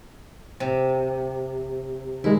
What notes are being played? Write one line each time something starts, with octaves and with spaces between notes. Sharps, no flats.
C3
D#3 G#3 E4